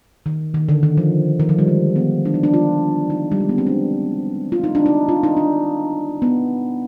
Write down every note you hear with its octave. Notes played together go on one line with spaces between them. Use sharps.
D#3
D#3
D3
D#3
F3
D#3
F3
G3
G#3
B3
D4
D#4
D4
F4
D#4
G3
G#3
B3
C4
D4
F4
D#4
D4
D#4
F4
D#4
D4
B3